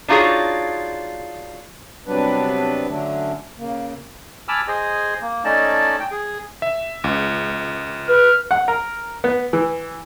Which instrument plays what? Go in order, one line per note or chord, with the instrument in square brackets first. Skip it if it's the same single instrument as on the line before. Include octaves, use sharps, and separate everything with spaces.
[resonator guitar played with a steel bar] D4 D#4 F4 F#4 G#4 C#5
[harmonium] C3 F#3 G3 B3 D4 B4
D3 F#3 A3 C#4 D4
C#3 A#3
[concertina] G#5 A5 B5 D6 E6 F6
G#4 C5 D#5 G#5
A#3
A3 C#4 D#4 D5 D#5 A5
G5
G#4
[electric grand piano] E5
C#2
[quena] B4 [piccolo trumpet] F6
[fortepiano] F#5
A#4
B3
E3